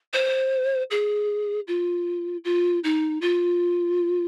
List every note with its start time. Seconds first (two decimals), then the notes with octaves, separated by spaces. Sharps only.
0.13 C5
0.91 G#4
1.67 F4
2.44 F4
2.84 D#4
3.21 F4